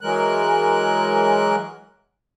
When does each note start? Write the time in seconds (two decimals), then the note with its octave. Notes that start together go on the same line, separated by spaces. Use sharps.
0.01 E3 F#3 G#3 A#4 F#6